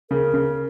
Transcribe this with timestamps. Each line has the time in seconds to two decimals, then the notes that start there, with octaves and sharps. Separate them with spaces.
0.11 C#3 A#4
0.34 C#3